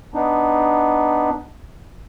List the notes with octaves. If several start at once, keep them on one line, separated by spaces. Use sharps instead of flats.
B3 D4 D#4